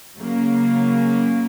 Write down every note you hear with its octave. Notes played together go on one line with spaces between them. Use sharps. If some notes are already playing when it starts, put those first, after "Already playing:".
C#3 F#3 A#3